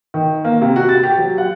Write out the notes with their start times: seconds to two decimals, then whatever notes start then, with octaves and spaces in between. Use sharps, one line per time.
0.14 D#3
0.45 A#3
0.62 C3
0.76 F#4
0.89 A6
1.03 G4
1.17 F#3
1.38 F#5